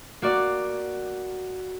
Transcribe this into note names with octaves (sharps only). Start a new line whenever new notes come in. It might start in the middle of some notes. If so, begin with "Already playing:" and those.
A#3 F#4 D5